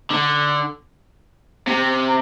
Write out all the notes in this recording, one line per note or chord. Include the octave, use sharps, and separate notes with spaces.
D3
C3